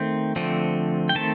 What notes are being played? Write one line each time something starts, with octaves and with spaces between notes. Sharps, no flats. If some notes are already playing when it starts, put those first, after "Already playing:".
Already playing: D#3 A3 C4 G5
D3 F3 A3 C4
G5
D#3 A3 C4 A5